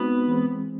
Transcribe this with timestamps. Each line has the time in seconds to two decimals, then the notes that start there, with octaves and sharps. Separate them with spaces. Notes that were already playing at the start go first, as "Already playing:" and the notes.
Already playing: G#3 B3 C4 D#4 F#4
0.28 E3 G#3 C4